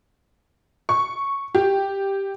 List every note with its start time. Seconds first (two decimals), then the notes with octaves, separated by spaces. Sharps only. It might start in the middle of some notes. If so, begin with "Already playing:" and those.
0.89 C#6
1.55 G4